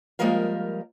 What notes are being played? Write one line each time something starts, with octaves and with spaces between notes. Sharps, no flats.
F3 G3 G#3 A#3 A#4 F5